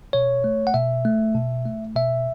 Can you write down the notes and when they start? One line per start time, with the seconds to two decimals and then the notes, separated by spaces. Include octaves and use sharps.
0.13 B2 C#5
0.44 A3
0.67 F#5
0.74 B2 E5
1.05 A3
1.35 B2
1.65 A3
1.96 B2 E5